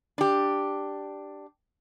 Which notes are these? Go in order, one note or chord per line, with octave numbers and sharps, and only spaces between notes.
D4 G4